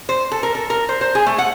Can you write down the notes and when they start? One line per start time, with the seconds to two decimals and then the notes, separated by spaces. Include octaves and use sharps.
0.09 C5
0.32 A4
0.43 A#4
0.55 A4
0.70 A#4
0.89 C5
1.01 C5
1.15 G#4
1.26 A3
1.38 F#5